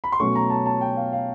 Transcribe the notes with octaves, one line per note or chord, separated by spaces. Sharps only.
B5
C6
B2 F#3 A3 C#4 C#6
A#5
A5
A5
G5
F5
F5